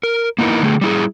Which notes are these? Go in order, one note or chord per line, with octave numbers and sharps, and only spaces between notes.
A#4
A#3 B3 D#4 E4 A#4
D3 A3 G#4
G3 E4 G#4